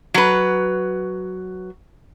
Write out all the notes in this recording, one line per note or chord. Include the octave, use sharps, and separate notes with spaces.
F#3 B4